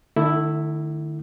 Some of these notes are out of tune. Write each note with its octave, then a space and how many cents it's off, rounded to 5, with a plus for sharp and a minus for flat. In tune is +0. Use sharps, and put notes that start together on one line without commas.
D#3 -45 A3 +20 E4 +0